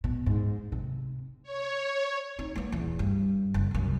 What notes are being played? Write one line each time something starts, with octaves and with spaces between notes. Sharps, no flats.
B2
G#2
C3
C#5
C4 D#4
A#3 B3
D#1 E2
G2
F#1
C2 F#2